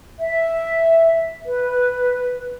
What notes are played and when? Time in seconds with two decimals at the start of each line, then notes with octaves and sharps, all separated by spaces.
0.19 E5
1.45 B4